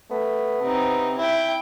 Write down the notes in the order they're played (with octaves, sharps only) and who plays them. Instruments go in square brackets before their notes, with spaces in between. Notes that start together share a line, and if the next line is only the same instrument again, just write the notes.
[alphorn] A3 [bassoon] B3
[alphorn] C3 [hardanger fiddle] C4 D#4
[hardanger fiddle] E4 G5 [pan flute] E5